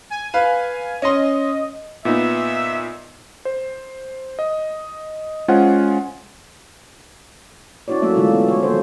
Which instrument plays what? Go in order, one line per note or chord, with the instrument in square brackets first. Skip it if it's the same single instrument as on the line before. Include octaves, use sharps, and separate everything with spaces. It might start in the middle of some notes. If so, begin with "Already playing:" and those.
[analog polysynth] G#5
[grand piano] B4 F5
[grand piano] C#4 C6 [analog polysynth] D#5
[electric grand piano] A#2 B3 D#4 [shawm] E5
[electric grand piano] C5
D#5
G#3 C#4 F4 C5 F#5 G#5
[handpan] C#4 D4 E4 F#4 C#5 D5
F#3 A3 A#3 E5
B2 D3 E3 G#3 A3 F4
B3
C#5
D#3 A#3 D4 F#4 C5 C#5